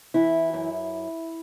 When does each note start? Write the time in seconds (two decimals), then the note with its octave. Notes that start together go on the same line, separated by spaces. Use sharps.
0.14 E3 E4
0.53 F#2